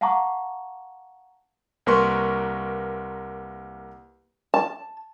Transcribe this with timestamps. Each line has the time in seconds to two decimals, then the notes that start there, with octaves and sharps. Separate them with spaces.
0.01 F5 F#5 A5 A#5 C#6 D6
1.86 C2 A#3 A#4 B4 C6 C#6
4.54 A5